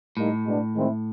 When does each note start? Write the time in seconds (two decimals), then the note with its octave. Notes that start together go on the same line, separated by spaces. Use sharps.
0.17 A2 G3 A#3 D#4
0.45 B2 G#3 B3 D4
0.74 D#3 G#3 C4 E4